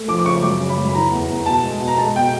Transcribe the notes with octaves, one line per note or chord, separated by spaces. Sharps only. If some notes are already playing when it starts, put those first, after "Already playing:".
Already playing: A3
F3 D6
D6
C#3 C#6
F#2 D6
C#3
B5
F#2
B5
E3 A#5
E2
E2
B2 A5
G#3
B2
A#5
G#3 A5
B2 G5